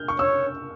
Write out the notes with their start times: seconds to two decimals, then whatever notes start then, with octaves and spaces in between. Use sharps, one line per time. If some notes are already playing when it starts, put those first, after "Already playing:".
Already playing: F6 G6
0.08 C#6
0.19 C#5 E6